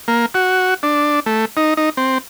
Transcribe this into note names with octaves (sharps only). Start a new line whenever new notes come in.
A#3
F#4
D4
A3
D#4
D#4
C4